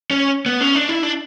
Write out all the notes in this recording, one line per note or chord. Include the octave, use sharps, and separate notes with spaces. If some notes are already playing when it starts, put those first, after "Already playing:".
C#4
B3
C#4
D4
E4
D4